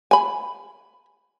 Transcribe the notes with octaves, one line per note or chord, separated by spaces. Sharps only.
G#5 B5